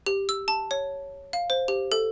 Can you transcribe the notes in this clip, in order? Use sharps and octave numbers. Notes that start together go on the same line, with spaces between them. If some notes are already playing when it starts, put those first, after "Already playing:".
G4
E6
A5
C#5
F5
C5
G4
A4